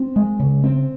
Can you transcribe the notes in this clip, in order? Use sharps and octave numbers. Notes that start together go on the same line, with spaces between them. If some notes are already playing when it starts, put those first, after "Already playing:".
Already playing: C4
G#3
C#3
C4